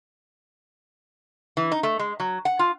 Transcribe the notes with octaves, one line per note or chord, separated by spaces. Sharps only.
E3
D#4
A3
G#3
F#3
F#5
F4